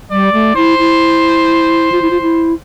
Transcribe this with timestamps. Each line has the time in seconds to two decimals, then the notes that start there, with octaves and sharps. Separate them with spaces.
0.11 G3 D5
0.33 A3
0.56 E4 C5
0.79 E4
1.92 F4
2.02 E4
2.11 F4
2.22 E4